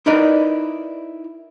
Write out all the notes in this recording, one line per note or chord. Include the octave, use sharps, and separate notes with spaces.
D#4 E4 A#4 B4 D5 D#5